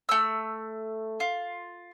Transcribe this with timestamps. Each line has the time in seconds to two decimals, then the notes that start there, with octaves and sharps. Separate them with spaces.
0.09 A3 E6
1.20 F4